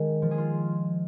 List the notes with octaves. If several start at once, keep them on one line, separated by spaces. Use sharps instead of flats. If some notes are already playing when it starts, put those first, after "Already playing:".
Already playing: D#3 G#3
F3
G#4
F4